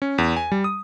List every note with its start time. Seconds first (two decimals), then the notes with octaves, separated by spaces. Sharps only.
0.02 C#4
0.18 E2
0.36 G#5
0.52 G3
0.64 D#6